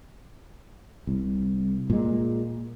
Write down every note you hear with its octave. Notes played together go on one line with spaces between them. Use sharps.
C2
A#2 G#3